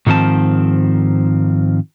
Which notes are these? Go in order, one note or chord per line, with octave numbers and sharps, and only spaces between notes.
G#2 D#3 F3 C4 A5